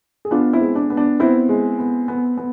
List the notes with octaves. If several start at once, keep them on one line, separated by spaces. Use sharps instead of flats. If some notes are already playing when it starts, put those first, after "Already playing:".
G#4
B3 D4 F4
C4 E4
G#3
D4
B3
D4
B3 C4 E4
G#3
B3
B3
B3